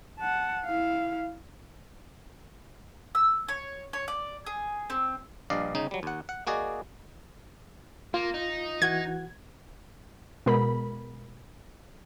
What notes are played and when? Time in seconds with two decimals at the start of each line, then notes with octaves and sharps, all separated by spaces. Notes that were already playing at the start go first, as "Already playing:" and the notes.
0.19 F#5 A5
0.66 E4 F5
3.15 E6
3.48 C#5
3.93 C#5
4.08 D5
4.46 G#4
4.90 C4
5.50 A#1 G2 D5 D#5 F5
5.75 G1 C#3 D#4
5.91 F#3 G3
6.03 D#2 F#5
6.29 F#5
6.47 A#3 F#4 G#4 D5 D#5
8.14 A#3 F4
8.34 D#4
8.82 E3 F#4 F#5 G#6
10.46 B2 G#3 A#4 B5